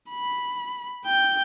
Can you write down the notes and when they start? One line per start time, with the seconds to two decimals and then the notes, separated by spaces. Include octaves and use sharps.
0.10 B5
1.06 G5 G6